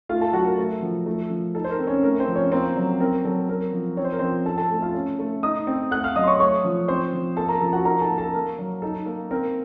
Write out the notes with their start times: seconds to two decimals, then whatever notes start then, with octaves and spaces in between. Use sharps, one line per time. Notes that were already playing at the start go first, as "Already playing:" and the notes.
0.09 A3 F4 F5
0.21 A4 A5
0.33 F#3 F#4 F#5
0.45 A#4
0.58 A3
0.82 F3
1.06 A3
1.30 F3
1.55 D#4 A4
1.64 C5
1.70 A#4
1.79 C4
1.87 C#4 C#5
2.03 A3 A#4
2.19 C4 C5
2.28 F3
2.36 C#4 C#5
2.52 A#3 C4 C5
2.76 F#3
3.00 C4 A#4
3.24 F#3 A4
3.49 C4 A#4
3.73 F3
3.97 C4 C#5
4.04 C5
4.12 A#4
4.19 F3 C4 C5
4.46 C4 A4 A5
4.58 A4 A5
4.70 A3
4.82 F4 F5
4.94 C#4
5.19 A3
5.43 D#4 D#5 D#6
5.67 C4
5.91 A3 F#5 F#6
6.04 F5 F6
6.16 F#3 D#5 D#6
6.23 C6
6.27 C#5 C#6
6.39 A3 C#5 C#6
6.65 F3
6.88 C4 C5 C6
7.13 F3
7.37 A#3 A4 A5
7.49 A#4 A#5
7.61 F3 A4 A5
7.73 F#4 F#5
7.85 D#4 A#4 A#5
8.01 A4 A5
8.10 A#3
8.18 A4 A5
8.34 A#3 A#4
8.59 F#3
8.82 D#4 A4
9.06 A#3
9.31 C4 A#4